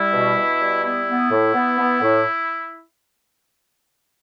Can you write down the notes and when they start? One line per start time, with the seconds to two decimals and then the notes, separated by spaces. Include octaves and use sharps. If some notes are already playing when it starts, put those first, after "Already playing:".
Already playing: G3 E4
0.13 B2
0.36 B2
0.60 G3
0.83 B3 E4
1.07 B3
1.31 A2
1.54 B3
1.78 B3
2.02 A2